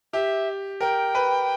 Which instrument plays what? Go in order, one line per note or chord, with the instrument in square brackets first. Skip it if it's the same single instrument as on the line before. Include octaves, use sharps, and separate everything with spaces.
[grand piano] G4 [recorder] E5
[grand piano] A#4 [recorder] G5
[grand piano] B4